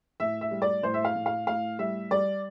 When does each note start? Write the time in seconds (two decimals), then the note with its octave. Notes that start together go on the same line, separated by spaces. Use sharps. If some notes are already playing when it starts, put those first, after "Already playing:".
0.20 A2 E5
0.41 E5
0.51 G3
0.62 D5
0.83 A2 C5
0.94 E5
1.05 F5
1.15 A2
1.26 F5
1.47 A2 F5
1.79 G3 E5
2.11 G3 D5